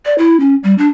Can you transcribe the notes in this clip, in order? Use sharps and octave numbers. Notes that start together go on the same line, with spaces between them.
D5
E4
C#4
G3
D4